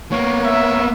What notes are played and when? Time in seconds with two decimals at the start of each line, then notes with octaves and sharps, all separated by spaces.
0.12 A#3 B3 C#5
0.44 E5